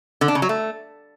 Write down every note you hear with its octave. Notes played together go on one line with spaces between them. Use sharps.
D3
D4
C#3
F#3
A3